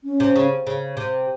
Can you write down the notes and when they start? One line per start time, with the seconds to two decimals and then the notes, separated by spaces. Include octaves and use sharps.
0.04 C#4
0.20 C3
0.36 C#3
0.67 C#3
0.97 C3